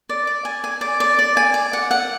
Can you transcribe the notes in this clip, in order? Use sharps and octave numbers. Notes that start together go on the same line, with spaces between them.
D5
D5
G#5
G#5
D5
D5
D5
G#5
D5
F#5
F#5